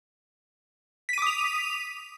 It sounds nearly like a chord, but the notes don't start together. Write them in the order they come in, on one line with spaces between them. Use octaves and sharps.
B6 D#7 D6 D#6 F7